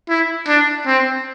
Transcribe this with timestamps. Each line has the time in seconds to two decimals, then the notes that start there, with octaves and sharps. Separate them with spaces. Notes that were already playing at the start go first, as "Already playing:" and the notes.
0.09 E4
0.48 D4
0.86 C4